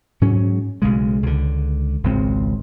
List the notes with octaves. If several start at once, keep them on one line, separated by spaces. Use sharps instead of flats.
G#2 F#3 C#4
B1 C#3 G#3
C#2 D3
G#1 C#2 C4